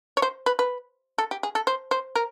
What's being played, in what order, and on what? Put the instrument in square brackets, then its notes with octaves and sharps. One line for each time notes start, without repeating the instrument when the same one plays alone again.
[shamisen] C#5
C5
B4
B4
A4
G4
G#4
A4
C5
C5
A#4